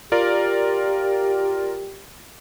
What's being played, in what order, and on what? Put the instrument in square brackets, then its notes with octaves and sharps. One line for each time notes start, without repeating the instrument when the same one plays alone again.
[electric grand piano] F4 A#4 D5 [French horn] G4